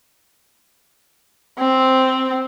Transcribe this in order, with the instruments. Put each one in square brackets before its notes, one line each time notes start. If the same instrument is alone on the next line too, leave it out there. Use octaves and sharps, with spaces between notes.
[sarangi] C4